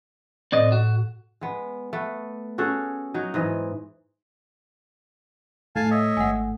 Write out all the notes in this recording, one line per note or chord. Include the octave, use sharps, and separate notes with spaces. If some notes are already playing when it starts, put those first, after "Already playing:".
A2 C4 D5 D#5
F#4
G#3 B3
A3 B3
C#4 F#4 G#4 A4
F#3 D#4 C#5
G#2 E3 D#5
A2 A3 F5 G#5 A5
C#5 D#5 E5
G#1 F#5 G#5